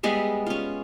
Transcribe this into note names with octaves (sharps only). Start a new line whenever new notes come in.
G3 G#3 B3 E5
C#4 F4